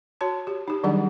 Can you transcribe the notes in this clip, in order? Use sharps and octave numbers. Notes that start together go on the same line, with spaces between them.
F#4 C#5 A5
G4
D#4 G4
D#3 F#3 G3 D4 G#4 F#5